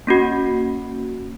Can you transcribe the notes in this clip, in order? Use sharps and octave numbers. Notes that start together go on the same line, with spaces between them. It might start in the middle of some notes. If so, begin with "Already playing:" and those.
A#3 C#4 F#4